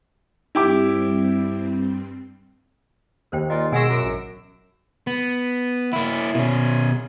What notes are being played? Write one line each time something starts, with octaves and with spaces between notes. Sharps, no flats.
G2 G3 C4 E4 G4 D6
D#2 A#4 C5 G5
A#2 D#5
B2 G#3 A#4 F#5 C#6 E6 A#6 D7
F#2
A1
B3
A#3 E4
B2 C#4